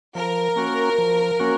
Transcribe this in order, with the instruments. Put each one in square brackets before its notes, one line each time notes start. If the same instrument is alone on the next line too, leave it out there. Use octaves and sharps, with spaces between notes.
[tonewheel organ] F3 [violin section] A#4
[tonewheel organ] A#3 C#4 F#4
F3
A#3 C#4 F#4